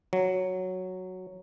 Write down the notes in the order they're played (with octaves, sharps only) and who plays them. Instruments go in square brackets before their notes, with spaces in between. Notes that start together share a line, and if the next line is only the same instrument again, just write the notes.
[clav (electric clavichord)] F#3